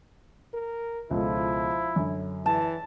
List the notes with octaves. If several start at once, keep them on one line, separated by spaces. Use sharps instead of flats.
A#4
C#2 B2 F3 E4 A4
F#2 D3
E3 A5